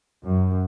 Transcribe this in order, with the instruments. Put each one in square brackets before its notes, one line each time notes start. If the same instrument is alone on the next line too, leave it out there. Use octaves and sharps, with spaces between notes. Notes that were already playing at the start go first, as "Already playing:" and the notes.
[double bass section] F#2